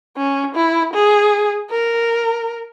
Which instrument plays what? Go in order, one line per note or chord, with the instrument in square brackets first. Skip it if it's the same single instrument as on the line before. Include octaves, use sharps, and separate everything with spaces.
[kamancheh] C#4
E4
G#4
A#4